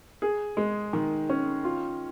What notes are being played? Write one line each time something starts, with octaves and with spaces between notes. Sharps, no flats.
G#4
G#3
D#3
C#4
F4